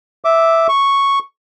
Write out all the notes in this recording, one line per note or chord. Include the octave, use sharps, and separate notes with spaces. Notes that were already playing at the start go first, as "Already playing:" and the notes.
E5 D6
C#6